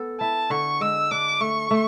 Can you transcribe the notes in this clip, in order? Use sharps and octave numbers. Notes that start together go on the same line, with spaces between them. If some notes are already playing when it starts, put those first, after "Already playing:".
Already playing: B3 A4
E4 A5
D3 C#6
G#3 E6
D4 D6
A3 C#6
A3